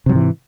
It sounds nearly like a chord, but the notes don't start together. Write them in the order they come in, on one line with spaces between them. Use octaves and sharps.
C3 F#3 G#2 E3